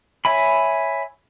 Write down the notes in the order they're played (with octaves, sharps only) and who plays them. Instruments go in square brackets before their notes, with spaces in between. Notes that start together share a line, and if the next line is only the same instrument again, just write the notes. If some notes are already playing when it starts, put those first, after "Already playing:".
[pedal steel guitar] C#5 E5 G#5 B5